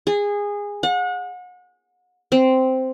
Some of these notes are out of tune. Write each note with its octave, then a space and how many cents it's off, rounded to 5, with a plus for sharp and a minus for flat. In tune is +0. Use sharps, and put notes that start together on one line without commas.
G#4 -20
F#5 -35
C4 -5